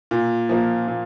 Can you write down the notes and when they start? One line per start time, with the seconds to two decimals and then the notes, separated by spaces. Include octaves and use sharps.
0.11 A#2
0.49 F3 A#3
0.88 A#2